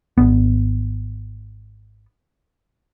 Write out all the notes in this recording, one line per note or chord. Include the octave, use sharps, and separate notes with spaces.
G#1 B3